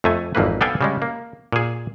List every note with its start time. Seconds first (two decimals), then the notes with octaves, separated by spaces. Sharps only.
0.04 F2 A3 G#5
0.35 G#1 F2 E3 A#3 B4
0.61 B3 A4 D5 F5 G5 G#5
0.81 C#3 G3 G#3
1.02 A#3
1.53 A#2 G#4